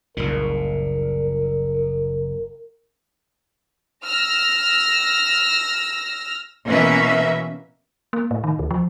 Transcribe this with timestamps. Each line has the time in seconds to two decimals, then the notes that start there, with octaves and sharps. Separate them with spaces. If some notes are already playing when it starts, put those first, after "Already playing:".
0.17 F#1 C2 A#2 A#4
4.04 E6 F6 A#6
6.67 B2 E3 A#3 C#4 B4 E5
8.13 A#3
8.31 A2
8.44 D#3
8.59 D2
8.71 F3